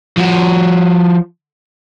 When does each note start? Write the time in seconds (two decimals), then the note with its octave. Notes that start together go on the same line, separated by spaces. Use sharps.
0.17 F3 F#4